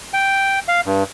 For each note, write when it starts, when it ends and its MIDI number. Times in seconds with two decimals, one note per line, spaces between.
0.14 0.59 79
0.68 0.81 77
0.86 1.03 43